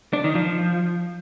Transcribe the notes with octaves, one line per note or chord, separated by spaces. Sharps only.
D4
D#3
F3